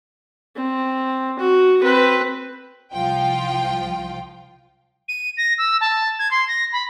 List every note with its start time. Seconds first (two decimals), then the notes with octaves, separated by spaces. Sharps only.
0.56 C4
1.39 F#4
1.82 C4 B4
2.93 C2 F3 F4 G5
5.08 D#7
5.37 A#6
5.58 E6
5.80 A5
6.19 G#6
6.31 C6
6.48 A#6
6.72 B5